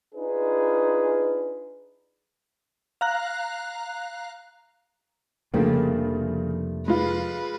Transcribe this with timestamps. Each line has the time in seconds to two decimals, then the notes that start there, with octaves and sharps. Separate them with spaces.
0.15 D4 D#4 F4 G#4 B4
3.01 F5 A#5 F#6
5.54 F1 C#3 F3 G3 A3 A#3 D4
6.88 G#3 F4 B4